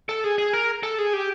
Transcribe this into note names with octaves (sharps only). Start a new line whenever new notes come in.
A4
G#4
G#4
A#4
A4
G#4
G4